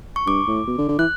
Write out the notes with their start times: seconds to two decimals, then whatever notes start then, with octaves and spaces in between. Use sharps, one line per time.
0.16 C#6
0.27 G2 D6
0.47 A2
0.67 B2
0.78 D3
0.88 D3
0.99 E3 F#6